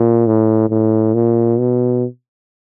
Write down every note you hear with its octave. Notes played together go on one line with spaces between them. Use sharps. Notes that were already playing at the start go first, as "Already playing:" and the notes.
Already playing: A#2
A2
A2
A#2
B2